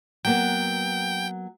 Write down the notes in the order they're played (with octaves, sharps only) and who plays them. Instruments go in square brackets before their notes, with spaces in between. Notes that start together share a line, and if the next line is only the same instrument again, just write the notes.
[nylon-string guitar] F#3 A#3 B3 [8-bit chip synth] G5